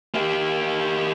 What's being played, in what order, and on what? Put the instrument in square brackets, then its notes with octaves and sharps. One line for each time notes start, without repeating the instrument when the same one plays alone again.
[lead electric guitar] A#3 G4